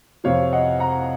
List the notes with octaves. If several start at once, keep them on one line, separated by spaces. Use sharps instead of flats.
F2 C3 F3 C#5 F5
D#5 F#5
F#5 A#5